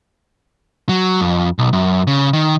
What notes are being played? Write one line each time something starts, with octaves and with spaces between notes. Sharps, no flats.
F#3
F2
B1
F#2
C#3
D#3